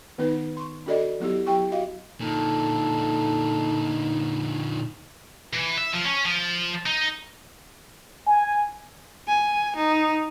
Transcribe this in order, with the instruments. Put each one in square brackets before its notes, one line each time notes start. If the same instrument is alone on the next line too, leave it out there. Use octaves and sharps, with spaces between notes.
[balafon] D#3 B3 D#4 B4
C6 C#6
D4 F#4 A4 D5 D#5
F#3 B3 E4 G4
F#3 E4 G4 G5 C#6
F#4 D#5 F5
[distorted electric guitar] A#2 D3 [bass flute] D#4 [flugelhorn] A4
[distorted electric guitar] E3
E5
F3
C#4
F3
D#4
[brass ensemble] G#5
[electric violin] G#5
D#4